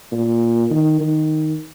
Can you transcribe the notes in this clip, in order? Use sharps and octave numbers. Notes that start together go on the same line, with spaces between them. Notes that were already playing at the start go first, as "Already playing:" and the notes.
A#2
D#3
D#3